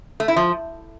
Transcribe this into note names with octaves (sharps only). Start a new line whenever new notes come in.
A3
E4
F3